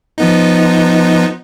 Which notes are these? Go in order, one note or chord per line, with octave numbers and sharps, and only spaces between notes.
F3 B3 D#4